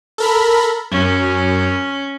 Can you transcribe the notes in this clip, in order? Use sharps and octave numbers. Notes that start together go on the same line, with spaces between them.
A4 A#4 B5
F#2 C#4